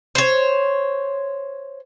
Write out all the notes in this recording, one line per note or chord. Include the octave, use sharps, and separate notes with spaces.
C5 C#5